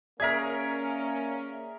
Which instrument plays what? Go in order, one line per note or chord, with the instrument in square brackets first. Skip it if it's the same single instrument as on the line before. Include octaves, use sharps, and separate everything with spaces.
[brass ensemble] A#3 C#4 [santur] G#4 A#4 [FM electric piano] D5 E5 [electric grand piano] G#6 B6